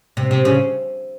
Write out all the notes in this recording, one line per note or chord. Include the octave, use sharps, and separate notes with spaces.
C3
C3
C#3